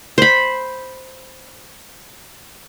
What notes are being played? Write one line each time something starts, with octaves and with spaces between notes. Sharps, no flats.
C5 B5